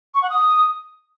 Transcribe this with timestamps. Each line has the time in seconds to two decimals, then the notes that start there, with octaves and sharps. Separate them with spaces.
0.14 C#6
0.22 F#5
0.30 D#6